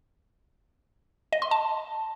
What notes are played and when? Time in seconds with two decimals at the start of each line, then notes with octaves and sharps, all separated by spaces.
1.33 D#5
1.42 C6
1.51 A5